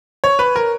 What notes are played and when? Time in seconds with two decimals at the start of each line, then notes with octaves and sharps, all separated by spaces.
0.24 C#5
0.39 B4
0.56 A#4